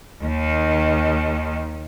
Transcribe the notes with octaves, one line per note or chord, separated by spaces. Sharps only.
D#2 D#3